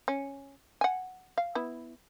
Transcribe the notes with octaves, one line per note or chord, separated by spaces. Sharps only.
C#4
F#5 G#5
F5
B3 E4